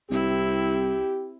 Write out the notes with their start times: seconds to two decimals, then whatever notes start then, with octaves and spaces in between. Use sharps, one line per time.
0.11 C2 C4 E4 G4